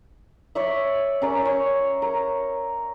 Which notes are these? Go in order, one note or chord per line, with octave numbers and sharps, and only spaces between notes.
C#5 D5 E5
C#4 A#4 D5
C#5 D5
A#4